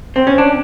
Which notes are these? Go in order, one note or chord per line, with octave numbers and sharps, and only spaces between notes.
C4
C#4
D4